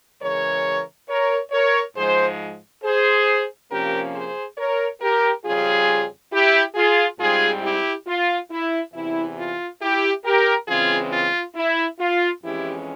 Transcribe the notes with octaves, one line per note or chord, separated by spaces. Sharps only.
C#3 E3 G#3 A#4 C#5
A#4 C#5
A#4 C#5
G#2 F3 G#3 G#4 C5
G#4 C5
C3 F3 A#3 C#4 G4 A#4
G#4 C5
A#4 C#5
G4 A#4
F2 C#3 G3 C#4 F4 G#4
E4 G4
F4 G#4
G#2 G3 C4 F4 G#4
E4 G4
F4
E4
E2 C3 E3 E4
F4
E4 G4
G4 A#4
C#3 E3 G#3 C4 F4 G#4
F4
E4
F4
F2 E3 G#3 C#4 E4 G4